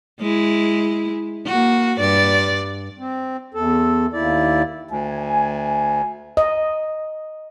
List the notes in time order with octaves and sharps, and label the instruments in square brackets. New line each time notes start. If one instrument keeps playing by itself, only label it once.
[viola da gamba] G#3 E4
A#3 F#4
G2 D5
[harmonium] C4
E2 A4
D#2 E4 D5
[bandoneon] D2 [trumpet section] G#5
[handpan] D#5